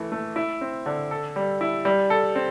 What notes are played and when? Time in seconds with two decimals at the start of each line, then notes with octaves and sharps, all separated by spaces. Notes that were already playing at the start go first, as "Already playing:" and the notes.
Already playing: E3 A3
0.12 A3
0.36 E4
0.61 C4
0.86 D3
1.11 A4
1.36 G3
1.61 E4
1.85 G3
2.10 A4
2.35 C4